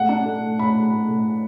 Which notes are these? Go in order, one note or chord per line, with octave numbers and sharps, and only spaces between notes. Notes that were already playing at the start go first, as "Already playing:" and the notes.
Already playing: A2 F#5
D4
A3
A2
A2 B5
A2
A2
A2